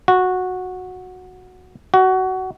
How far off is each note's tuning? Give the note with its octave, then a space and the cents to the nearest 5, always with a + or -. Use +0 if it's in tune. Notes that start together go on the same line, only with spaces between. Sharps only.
F#4 -10
F#4 +20